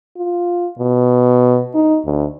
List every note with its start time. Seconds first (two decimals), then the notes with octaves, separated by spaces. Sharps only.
0.17 F4
0.79 B2
1.75 D#4
2.05 D2